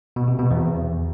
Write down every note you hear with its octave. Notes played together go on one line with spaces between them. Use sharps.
B2
C3
B2
E2